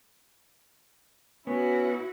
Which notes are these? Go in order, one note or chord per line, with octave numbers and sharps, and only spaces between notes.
B3 C#4 E4 F#4